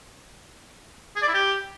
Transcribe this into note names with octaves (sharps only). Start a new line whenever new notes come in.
G#4
D5
E4
G4